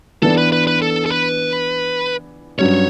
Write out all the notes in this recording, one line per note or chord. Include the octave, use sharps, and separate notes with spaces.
E3 B3 D4 A4
B4
B4
B4
A4
A4
B4
G2 F#3 C#4 C#5